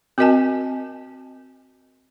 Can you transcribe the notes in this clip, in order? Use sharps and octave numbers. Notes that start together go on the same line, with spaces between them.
C4 F#4 A#4 D#5 G#5 A5